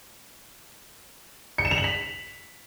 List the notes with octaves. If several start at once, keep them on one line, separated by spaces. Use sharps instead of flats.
C#7
E7
F7
F#7
B6